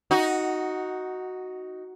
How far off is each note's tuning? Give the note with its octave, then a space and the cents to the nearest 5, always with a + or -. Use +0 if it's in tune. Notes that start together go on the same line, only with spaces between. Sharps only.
D#4 +5 F#4 +0